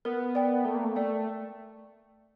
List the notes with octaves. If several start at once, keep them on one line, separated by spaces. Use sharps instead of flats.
B3 A#4
D5 G5
A3 A#4
A#3
A3
A3 D5 G5